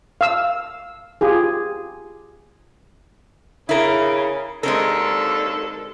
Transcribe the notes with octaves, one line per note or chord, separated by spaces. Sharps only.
F5 E6
F4 G4 G#4
C#3 E4 A#4
D#2 D3 G#3 C4 A4 A#4